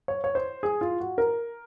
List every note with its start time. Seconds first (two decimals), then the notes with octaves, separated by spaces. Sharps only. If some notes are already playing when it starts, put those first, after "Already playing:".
0.08 C#5
0.24 C#5
0.35 C5
0.63 G#4
0.81 F4
1.00 F#4
1.18 A#4